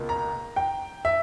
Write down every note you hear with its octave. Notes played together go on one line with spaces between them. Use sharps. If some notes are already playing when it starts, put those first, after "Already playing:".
Already playing: C#2 B2 A#3
A#5
G5
E5